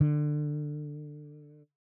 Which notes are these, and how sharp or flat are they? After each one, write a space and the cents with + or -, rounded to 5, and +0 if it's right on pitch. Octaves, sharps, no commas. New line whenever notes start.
D3 +20